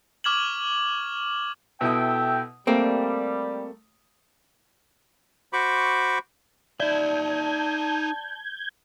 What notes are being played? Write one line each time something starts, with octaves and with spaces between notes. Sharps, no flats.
C#6 D6 F6 G#6 E7 F#7
B2 E4 A4 E5 G5 D#6
G3 A3 A#3 C4
F#4 C5 B5 C#6 D6
D#4 D5 E5 A5 G6 G#6